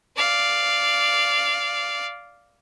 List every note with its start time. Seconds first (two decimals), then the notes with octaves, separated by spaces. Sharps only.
0.16 D5 F5